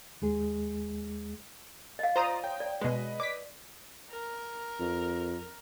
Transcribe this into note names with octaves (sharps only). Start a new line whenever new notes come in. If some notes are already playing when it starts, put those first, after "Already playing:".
D#2 G#3 G#4
D#5 F5
F4 C5 D5 A#5 D#6
C#5 G5
D5
B2 G#3 B4 D#5
D5 D6 B6
A#4
F2